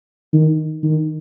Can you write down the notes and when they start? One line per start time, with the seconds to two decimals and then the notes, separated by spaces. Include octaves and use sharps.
0.33 D#3
0.83 D#3